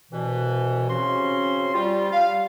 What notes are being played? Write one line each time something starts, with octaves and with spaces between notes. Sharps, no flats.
C2 B2 E3
C#3 C4 C#4 F#4 C6
G3 F4
F5